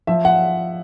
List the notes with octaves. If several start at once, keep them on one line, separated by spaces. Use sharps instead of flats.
F3 E5
F#5